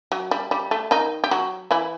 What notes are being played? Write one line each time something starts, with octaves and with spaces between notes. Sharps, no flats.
F#3
G3
G3
A3
D#3 D#4
G4
F#3 F#4
E3 E4